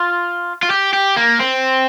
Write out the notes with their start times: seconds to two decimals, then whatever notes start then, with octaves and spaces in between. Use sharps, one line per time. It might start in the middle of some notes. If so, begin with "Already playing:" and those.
Already playing: F4
0.63 F4
0.70 G4
0.94 G4
1.17 A#3
1.40 C4